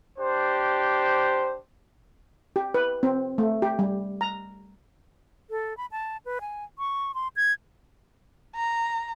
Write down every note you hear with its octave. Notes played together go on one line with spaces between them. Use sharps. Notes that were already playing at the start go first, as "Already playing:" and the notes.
D4 G4 C5
G4
B4
C4
A3
G4
G3
A#5
A4
B5
A5
B4
G#5
C#6
C6
G#6
A#5